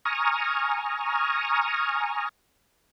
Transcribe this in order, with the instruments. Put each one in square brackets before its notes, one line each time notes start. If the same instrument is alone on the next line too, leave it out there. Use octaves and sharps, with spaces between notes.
[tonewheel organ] G#5 A#5 C#6 D#6 F6